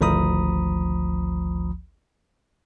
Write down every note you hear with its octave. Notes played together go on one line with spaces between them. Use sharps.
G#1 D2 F3 A#5 B5 D#6